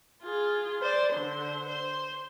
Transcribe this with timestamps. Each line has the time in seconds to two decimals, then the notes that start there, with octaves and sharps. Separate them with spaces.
0.23 F4 G#4
0.82 C5 D5
1.12 D3 C5
1.69 C5